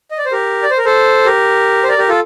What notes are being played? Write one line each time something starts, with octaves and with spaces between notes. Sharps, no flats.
D#5
D5
C5
G4 A#4
D5
C5
A#4
A4 C5
G4 A#4
C5
A#4 D5
G4 A#4
F4 A4